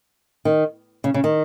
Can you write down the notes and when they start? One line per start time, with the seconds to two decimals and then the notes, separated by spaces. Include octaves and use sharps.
0.45 D#3
1.04 C#3
1.14 C#3
1.24 D#3